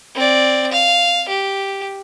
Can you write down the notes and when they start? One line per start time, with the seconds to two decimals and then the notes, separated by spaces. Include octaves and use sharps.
0.15 C4 D5
0.71 F5
1.28 G4